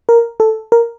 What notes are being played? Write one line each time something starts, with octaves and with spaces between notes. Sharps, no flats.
A#4
A4
A#4